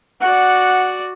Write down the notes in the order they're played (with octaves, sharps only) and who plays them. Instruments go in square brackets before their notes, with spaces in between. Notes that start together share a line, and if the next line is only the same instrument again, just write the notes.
[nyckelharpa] F#4 D5 [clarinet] F#5